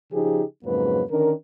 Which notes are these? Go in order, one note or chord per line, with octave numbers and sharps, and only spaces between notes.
C#3 F3 D#4 G4 G#4
F2 G#2 C#3 F#3 A#3 B4
D3 D#3 C#4 D4 A#4